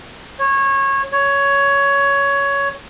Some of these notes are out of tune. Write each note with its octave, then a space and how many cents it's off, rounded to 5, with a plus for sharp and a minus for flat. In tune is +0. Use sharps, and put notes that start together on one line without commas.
C#5 -20
C#5 +10